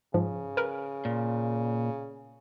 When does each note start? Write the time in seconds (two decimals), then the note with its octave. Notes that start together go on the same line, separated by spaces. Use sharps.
0.14 G#2 C#3 F3
0.57 A#4 B4
1.05 A#2